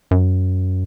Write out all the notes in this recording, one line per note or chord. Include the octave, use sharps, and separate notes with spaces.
F#2